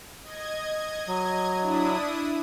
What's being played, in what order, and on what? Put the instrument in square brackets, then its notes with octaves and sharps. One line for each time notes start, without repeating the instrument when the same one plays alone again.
[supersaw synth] D#5 G#6
[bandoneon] F#3
[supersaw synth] D4 E4 D#6